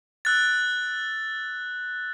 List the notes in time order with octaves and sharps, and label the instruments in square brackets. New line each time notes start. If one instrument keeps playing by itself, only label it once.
[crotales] E6 F#6 A6